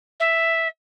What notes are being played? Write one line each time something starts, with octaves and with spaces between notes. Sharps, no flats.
E5